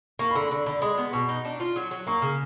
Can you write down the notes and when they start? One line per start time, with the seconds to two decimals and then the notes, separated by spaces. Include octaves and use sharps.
0.19 A#3 C#6
0.31 B5
0.35 D3 C6
0.51 D3 B5
0.66 D3 B5
0.82 G#3 C6
0.98 B3
1.13 B2 C#6
1.29 D#4
1.45 D4
1.60 F4
1.76 F#3
1.91 F#3
2.07 A#3 C#6
2.22 C#3